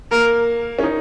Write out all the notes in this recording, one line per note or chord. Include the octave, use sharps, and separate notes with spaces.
A#3 A#4
C#4
D#4